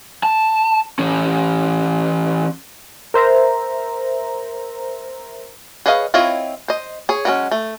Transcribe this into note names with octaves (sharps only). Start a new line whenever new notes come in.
A5
E3 C#4
A#4 C5 E5 A#5
G#4 B4 C#5 D#5 F5
C4 E4 F4 C#5 D#5
C5 D#5
G#4 C#5
F#3 G#3 C4 C#4
A3